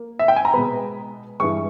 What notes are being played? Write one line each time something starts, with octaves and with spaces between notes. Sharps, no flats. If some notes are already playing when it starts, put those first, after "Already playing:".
Already playing: A#3
E5
G5
G#5
A#5
B2 G#3 B3 B5
G2 E3 G#3 C#6